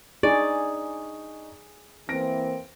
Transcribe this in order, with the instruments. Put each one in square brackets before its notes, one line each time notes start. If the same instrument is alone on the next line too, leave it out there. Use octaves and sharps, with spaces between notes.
[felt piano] D4 D#4 C#6 [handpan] G#4 [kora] D5
[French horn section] E3 A#3 C4 [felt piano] A#6 D7